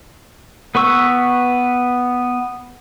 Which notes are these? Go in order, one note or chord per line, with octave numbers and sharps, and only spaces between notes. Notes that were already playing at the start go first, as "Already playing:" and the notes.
B3 B4 C#6 E6